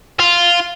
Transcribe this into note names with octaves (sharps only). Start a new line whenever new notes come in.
F4